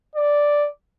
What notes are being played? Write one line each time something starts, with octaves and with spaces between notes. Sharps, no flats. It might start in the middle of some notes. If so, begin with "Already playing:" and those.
D5